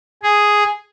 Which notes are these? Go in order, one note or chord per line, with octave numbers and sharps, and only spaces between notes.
G#4